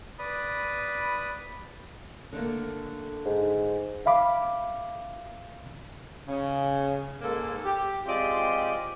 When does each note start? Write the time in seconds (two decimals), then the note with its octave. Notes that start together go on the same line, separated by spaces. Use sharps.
0.19 B4 D5 B5 D#6
2.33 D3 A3 A#3
3.25 G#2
4.06 E5 F5 B5 D6
6.27 C#3
7.21 G#2 A#3 A4
7.64 G4
8.05 G#3 C4 F4 G4 D5 D#5